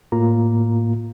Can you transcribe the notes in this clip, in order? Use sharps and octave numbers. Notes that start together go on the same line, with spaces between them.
A2 A#3 F4 A#5